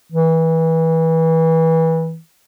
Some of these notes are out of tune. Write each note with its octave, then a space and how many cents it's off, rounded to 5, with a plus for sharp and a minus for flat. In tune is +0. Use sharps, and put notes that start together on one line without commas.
E3 -25